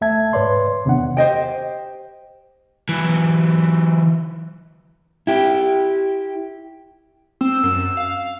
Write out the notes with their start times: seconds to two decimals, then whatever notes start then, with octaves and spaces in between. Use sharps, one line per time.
0.01 D2 A3 E5 A5 G#6
0.33 G#2 B4 C#5 D5 C6
0.85 E2 C3 D#3 B3 D4 F#5
1.17 G4 C5 D#5 G5
2.89 E3 F#3
5.27 E4 G4
7.41 C4 E6
7.63 F#2
7.97 F5